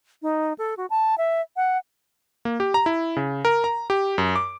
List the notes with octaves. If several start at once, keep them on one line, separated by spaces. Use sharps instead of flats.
D#4
A4
F#4
A5
E5
F#5
A#3
G4
A#5
E4
C#3
A#4
A#5
G4
F#2
D6